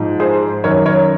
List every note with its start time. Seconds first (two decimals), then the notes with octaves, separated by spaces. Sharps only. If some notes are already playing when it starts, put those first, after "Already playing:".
Already playing: G#2 F3
0.20 G#4 C5
0.64 F#2 D#3 A#4 C#5
0.86 A#4 C#5